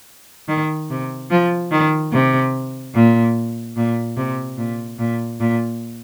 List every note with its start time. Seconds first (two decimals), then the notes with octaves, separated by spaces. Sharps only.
0.48 D#3
0.90 C3
1.30 F3
1.71 D#3
2.13 C3
2.94 A#2
3.76 A#2
4.17 C3
4.58 A#2
4.99 A#2
5.40 A#2